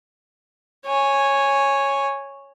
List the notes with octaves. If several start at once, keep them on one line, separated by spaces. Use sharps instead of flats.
C#5 G#5